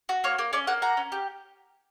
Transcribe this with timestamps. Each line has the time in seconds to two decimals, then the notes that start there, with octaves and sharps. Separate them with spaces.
0.09 F#4
0.24 A#3 C#5
0.39 A#3
0.53 C#4 D5
0.67 A#3 F#5
0.82 F#4 A#5
0.97 C#4
1.12 G4